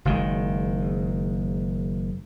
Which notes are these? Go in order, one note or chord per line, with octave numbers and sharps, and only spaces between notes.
F#1 D#3 G#3